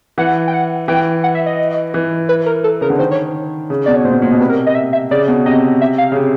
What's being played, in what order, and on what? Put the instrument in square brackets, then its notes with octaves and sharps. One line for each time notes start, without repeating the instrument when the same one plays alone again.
[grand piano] E3 [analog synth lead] F#5
[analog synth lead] G5
F#5
[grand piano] E3 [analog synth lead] G5
[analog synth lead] F#5
E5
D#5
[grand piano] E3
[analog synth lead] B4
A#4
A4
[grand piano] C#3 [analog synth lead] A#4
[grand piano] D3
[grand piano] D#3 [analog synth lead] C5
[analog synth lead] C#5
[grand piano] C#3
[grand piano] B2 [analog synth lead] D5
[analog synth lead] C#5
[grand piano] A#2 [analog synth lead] C5
[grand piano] B2
A#2
B2
[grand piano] C3 [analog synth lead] B4
[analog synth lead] A#4
D#5
E5
E5
[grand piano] C#3 [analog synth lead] D5
[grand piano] B2
[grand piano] C3 [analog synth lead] D#5
[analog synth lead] E5
F5
[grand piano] C#3
C3